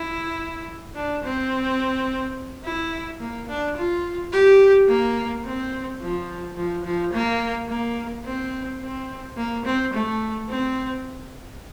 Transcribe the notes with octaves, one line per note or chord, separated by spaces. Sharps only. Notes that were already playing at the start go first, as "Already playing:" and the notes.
Already playing: E4
D4
C4
E4
A#3
D4
F4
G4
A#3
C4
F3
F3
F3
A#3
A#3
C4
C4
A#3
C4
A3
C4